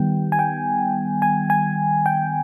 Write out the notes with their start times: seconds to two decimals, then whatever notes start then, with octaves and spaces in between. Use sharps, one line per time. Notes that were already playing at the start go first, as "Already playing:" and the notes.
Already playing: D#3 G3 B3 G5
0.32 G#5
0.39 G5
1.22 G#5
1.50 G#5
2.06 G5